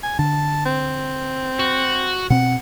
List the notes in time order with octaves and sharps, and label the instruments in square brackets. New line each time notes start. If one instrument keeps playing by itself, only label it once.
[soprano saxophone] G#5
[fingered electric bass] D3 [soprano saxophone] A5
[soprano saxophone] C4
[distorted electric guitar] F#4
[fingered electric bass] B2 C4 [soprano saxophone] F#5